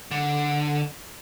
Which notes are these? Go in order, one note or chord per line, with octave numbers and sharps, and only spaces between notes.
D3